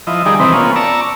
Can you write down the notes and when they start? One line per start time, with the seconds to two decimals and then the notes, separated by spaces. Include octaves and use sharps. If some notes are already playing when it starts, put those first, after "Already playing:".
0.07 F3 E4 D#5
0.26 D#3 G3 D#4 G#4 D5
0.40 C3 E3 C4 D#4 B4
0.53 A#3 B3 C#4 F4
0.76 D5 A5 A#5 C#6 E6